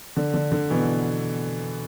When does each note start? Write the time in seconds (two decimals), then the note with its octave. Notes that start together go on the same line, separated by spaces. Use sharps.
0.17 D3
0.34 D3
0.52 D3
0.70 B2 E3